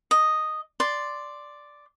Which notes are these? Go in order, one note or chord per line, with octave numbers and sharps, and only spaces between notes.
D#5
D5 C6